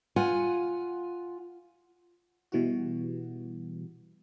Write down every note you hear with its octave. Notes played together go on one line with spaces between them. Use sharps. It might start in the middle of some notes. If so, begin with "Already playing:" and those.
F4 F#5 G#5
B2 E3 G3 F#4